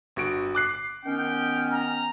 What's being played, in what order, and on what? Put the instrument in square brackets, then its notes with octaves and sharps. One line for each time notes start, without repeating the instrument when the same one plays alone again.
[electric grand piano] G1 F#4 D7
D6 F#6 C7
[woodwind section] D#3 B3 C#4 [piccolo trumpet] G5
[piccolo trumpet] A#5